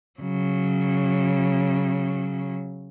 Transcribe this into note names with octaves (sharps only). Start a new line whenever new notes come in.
C#3 F#3